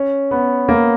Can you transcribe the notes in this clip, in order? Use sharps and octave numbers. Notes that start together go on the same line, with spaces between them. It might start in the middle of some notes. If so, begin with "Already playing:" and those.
Already playing: C#4
B3
A#3